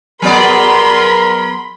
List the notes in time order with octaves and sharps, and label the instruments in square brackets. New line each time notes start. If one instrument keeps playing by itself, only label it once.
[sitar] F#3 B3 D5 [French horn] G#4 [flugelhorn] A#4 [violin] B5 C6